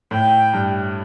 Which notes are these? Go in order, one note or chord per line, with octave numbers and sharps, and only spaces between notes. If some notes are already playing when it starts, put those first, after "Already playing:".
A2 G5
G2